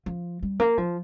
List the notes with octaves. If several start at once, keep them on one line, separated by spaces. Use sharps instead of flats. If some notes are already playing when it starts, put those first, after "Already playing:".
F3
G3
A#3
F3